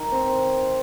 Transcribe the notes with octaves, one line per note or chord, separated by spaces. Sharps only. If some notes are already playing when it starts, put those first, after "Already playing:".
Already playing: D#3
C4